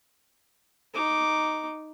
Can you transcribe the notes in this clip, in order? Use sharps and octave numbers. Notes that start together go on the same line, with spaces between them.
D#4 D6